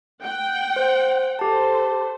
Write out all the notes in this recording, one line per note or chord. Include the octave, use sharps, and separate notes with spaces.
F#5 G5
C5
G4 A4 C5 A5